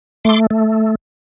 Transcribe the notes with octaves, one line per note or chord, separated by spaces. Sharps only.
A3 C6 D6
A3